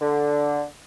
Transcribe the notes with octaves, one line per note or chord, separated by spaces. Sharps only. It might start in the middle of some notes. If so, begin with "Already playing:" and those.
D3